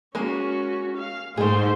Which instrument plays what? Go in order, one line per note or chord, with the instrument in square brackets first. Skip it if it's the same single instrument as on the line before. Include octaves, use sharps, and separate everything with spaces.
[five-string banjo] G#3 A#3 [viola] C#4 F#4
[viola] F5
[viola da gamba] G#2 [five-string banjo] A3 G#4 [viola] C5